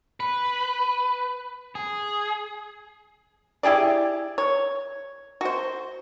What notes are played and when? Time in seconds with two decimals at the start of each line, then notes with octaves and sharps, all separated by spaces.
0.20 B4
1.75 G#4
3.63 E4 G4 G#4 D5
4.38 C#5
5.41 F#4 C5